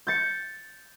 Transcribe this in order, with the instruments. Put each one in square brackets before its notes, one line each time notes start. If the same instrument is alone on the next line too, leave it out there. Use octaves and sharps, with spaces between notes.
[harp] G6 A6 C#7